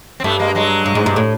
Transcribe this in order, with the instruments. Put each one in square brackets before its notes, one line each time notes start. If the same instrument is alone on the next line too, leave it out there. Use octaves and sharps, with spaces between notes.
[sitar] C4
[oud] G2 [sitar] A3 B3
[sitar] G#3 A#3
F#3 G#3
[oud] G2
G#2
G2
A2